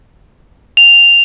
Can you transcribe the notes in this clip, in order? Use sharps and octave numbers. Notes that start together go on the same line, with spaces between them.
F7